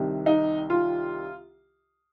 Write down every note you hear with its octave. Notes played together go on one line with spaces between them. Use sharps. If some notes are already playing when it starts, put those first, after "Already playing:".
Already playing: C2 C3 D#3
D#4
F4